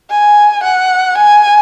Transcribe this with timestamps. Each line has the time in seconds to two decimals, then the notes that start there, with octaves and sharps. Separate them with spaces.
0.10 G#5
0.63 F#5
1.18 G#5